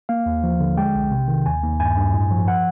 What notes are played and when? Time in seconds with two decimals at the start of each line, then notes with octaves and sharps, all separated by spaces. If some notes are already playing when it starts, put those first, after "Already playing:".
0.09 A#3 F5
0.26 D#2
0.44 F3
0.60 D3
0.77 G#3 G5
0.95 B1
1.11 C3
1.28 D#3
1.46 D#2 G#5
1.63 D#2
1.80 G2 G#5
1.97 G2
2.14 A2
2.31 F3
2.48 F#5